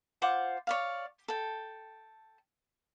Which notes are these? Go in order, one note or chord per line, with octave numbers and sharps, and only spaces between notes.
F4 C5 F#5 D6
C#5 D5 F5
A4 G5